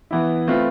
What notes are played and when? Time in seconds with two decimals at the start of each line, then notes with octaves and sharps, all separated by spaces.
0.11 E3 B3 E4
0.47 A3 C4 F4 B4